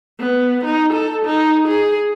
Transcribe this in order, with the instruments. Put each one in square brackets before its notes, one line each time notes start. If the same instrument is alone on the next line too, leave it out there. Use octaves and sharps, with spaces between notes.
[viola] B3
D#4
A4
D#4
G#4